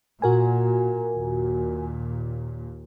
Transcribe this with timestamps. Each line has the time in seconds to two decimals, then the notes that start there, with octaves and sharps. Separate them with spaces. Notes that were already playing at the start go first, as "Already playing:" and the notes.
0.22 A#2 F#4 A#4 G#5
1.15 D#2 A#2